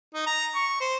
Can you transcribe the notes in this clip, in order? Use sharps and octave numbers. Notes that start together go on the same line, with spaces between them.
D#4
A#5
C#6
C5